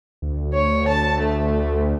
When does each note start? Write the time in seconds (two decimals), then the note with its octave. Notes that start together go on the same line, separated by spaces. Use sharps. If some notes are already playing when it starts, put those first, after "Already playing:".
0.22 D2
0.54 C#5
0.88 A5
1.21 A3